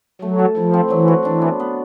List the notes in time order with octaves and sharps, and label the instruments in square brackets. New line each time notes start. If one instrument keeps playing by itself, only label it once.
[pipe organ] F#3 [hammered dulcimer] A3
[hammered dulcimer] A4
[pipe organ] F3 [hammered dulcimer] E4
[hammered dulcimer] C4
[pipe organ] E3 [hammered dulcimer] F#3
[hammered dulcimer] F#4
[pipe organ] E3 [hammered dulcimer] D4
[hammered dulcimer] B3
B3